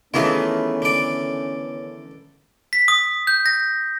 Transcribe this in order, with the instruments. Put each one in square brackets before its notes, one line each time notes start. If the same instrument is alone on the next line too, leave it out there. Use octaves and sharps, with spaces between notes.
[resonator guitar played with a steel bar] D#3 E3 A3 [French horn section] B3 C#4 [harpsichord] E4 F4 G#4
[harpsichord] D3 D5
[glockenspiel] B6
D#6
G6
A#6